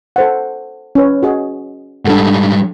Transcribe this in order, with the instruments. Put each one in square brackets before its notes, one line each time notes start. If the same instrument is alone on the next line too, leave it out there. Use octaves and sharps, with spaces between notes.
[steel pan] A4 C5 F#5
C#4 B4
F#4 G#4 D#5
[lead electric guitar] G#2 G3 [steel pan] D4 A4 F#5